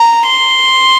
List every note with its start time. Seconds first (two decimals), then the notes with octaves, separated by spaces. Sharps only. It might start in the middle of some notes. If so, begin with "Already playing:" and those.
Already playing: A#5
0.27 C6